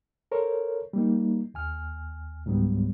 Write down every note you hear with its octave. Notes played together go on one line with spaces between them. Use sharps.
A4 A#4 C5 C#5
G3 A#3 D#4
D#2 G#5 F6
C#2 G#2 F#3 G3 B3